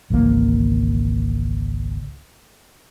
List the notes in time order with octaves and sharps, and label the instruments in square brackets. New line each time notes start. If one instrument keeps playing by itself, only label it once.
[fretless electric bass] G#1 C#2 E3 A#3